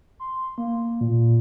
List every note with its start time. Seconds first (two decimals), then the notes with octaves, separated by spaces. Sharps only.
0.20 C6
0.58 A#3
1.01 A#2